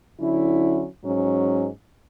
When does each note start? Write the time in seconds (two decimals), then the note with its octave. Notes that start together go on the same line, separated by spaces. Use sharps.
0.19 D3 F#3 C#4 E4
1.02 G#2 F#3 C#4